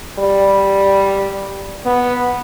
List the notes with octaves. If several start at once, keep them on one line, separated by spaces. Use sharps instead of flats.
G3
B3